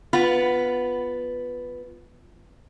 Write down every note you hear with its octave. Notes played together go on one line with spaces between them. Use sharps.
B3 F4 B4